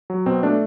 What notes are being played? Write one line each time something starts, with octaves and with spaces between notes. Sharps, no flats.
F#3
B2 C4
A3 D4